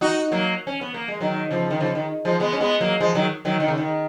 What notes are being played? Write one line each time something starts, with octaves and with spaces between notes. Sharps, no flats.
D#4 F#4
F#3 A#3
C#4
B3
A#3
G#3
D#3 F#3
C#3 F3
D#3
C#3 F3
D#3
F3 G#3
G#3 B3
C#4
G#3 B3
F#3 A#3
F3 G#3
D#3 F#3
D#3 F#3
D#3
C#3
D#3